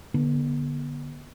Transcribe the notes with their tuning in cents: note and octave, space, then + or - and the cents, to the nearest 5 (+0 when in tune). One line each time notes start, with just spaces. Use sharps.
D3 -5 B3 -35 D4 +0